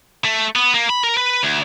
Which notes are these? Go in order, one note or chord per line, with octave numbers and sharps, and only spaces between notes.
A3
B3
A#3
B5
A#4
B4
D2